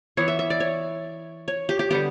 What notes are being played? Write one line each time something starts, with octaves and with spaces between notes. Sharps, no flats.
E3 B3 C#5
E5
E5
D5
C#5
C#5
G4
G4
D3 G3 B3 G4